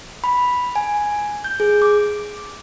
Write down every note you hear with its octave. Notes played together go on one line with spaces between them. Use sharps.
B5
G#5
G6
G#4
D6